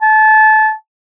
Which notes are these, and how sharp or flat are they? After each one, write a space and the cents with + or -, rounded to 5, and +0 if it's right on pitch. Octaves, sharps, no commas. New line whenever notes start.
A5 -25